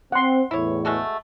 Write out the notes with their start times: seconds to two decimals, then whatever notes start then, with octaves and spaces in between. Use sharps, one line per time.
0.12 C4 F#5 C6
0.51 E2 A2 E4 C#5
0.85 G#3 A3 F#4